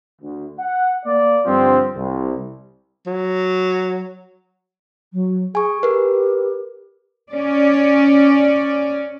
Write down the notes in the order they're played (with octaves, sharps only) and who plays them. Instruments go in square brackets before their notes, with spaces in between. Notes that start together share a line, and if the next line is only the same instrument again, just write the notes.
[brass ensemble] D2
F#5
A#3 D5
G2 D3 F3 C4
C2
[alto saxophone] F#3
[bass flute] F#3
[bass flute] G#4 [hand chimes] G#5 C#6
[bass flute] G4 [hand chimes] A#4 B4
[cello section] C#4 D5